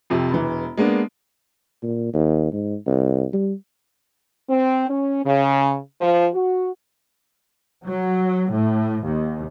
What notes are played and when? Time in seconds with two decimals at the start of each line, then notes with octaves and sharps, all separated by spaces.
0.10 F2 C3
0.31 E1 E3
0.77 G#3 A#3 B3 D4
1.83 A#2
2.13 D#2
2.52 G#2
2.87 C2
3.33 G3
4.48 C4
4.88 C#4
5.24 C#3
6.01 F3
6.34 F#4
7.86 F#3
8.51 A2
9.04 D#2